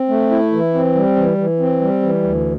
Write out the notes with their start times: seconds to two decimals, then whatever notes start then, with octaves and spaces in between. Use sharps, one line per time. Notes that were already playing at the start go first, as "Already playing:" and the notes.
Already playing: C4
0.09 A3
0.31 E4
0.52 E3
0.74 C4
0.95 G3
1.16 E3
1.38 E3
1.60 C4
1.81 G3
2.02 E3
2.23 D2